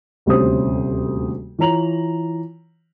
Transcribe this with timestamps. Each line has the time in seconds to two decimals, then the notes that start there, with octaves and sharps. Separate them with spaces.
0.26 D#1 D2 C3 C#4 C5 D#6
1.59 E3 F4 C#5 A#5 F7 F#7